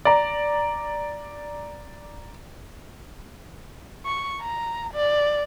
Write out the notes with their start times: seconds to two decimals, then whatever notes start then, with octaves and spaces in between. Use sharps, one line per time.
0.05 D5 A#5
4.06 C#6
4.42 A#5
4.94 D5